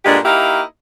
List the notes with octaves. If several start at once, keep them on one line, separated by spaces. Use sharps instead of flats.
G2 A#2 D3 G#3 D4 G4
A#3 D#4 E4 G4 D#5 F5